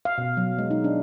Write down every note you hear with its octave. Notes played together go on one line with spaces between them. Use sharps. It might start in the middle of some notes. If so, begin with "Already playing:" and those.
F5
B2
F#3
G#3
D#4
D4